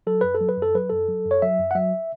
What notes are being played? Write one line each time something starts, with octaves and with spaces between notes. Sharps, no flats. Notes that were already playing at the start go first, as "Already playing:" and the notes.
F#3 A4
F#2 B4
A4
F#3
B4
F#2
A4
F#3 B4
F#2 A4
F#3
F#2
C#5
F#3 E5
F#2
F#5
F#3 E5